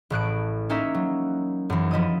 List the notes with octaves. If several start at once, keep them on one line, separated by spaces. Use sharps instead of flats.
A1 A2 F#6 D7
A#3 C#4 D#4 A#4 E5
F#3
F#2 E3
F3 E4 D#5 D#6